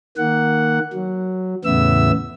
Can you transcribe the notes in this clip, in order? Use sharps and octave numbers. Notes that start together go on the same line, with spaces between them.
D#3 A#3 F#5
F#3
E2 A2 C#3 B3 E5 E6